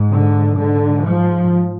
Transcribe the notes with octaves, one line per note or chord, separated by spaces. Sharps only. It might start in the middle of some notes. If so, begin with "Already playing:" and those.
Already playing: G#2
D3
G#2 D3
F3